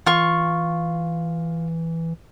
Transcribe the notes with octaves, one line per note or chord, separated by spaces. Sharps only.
E3 F4 C#6